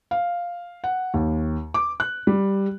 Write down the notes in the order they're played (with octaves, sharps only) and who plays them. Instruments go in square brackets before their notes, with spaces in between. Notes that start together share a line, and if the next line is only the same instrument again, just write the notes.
[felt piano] F5
F#5
D#2
D6
F#6
G3